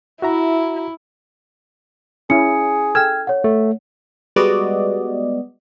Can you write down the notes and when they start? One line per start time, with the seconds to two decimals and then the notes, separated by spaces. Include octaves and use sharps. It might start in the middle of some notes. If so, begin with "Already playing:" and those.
0.22 E4 F#4 E5 A#5
2.30 C#4 E4 G#4 C#7
2.95 A4 G5 E6 F6 G#6
3.27 C#5 F#5
3.44 A3
4.36 G3 G#3 B3 F#4 D5 D#5